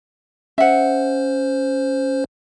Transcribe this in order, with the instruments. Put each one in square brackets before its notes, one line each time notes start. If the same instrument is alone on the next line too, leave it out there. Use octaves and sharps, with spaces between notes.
[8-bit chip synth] C#4 C5 [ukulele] E5 F#5